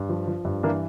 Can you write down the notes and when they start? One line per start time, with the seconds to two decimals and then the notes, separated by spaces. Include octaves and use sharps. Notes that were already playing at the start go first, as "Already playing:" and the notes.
Already playing: G2
0.09 F3
0.27 F3
0.45 G2
0.63 E3 A#3 D4